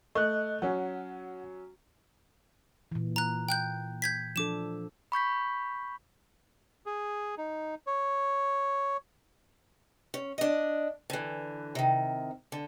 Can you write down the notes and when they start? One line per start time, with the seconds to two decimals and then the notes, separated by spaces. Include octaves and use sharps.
0.15 A3 D#5 F#6
0.62 F#3 C#4 F#5
2.92 A#2 E3
3.16 A#5 F#6
3.49 G5 F#6 G6
4.02 G6 G#6 B6
4.36 F3 D4 A4 D6 E7
5.12 B5 C#6 G6 B6
6.86 G#4
7.38 D#4
7.87 C#5
10.14 C#4
10.38 D4 D#5
11.10 D3 E3
11.75 C3 D#3
12.52 D3